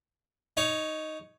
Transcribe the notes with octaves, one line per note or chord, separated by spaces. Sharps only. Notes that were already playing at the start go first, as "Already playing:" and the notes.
D#4 C#5